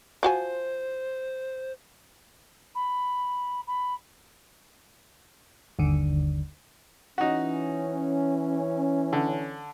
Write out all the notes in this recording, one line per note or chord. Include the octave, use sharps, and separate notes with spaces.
F3 F#4 C5 G#5
B5
B5
G1 D#2 D3
E3 C#4 D#4 F#4
D3